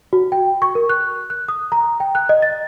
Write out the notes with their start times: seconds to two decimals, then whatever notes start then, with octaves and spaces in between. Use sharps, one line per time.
0.13 F#4
0.32 G5
0.62 C#6
0.75 A#4
0.89 F#6
1.30 F#6
1.49 D#6
1.72 A#5
2.00 G5
2.15 F#6
2.29 D#5
2.42 A6